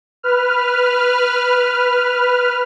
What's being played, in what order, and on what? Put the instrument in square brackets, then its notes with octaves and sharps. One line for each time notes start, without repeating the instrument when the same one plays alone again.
[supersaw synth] B4 F6